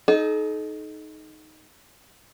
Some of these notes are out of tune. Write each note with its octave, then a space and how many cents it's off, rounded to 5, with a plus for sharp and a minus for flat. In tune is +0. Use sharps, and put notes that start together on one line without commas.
D#4 +0 A4 -40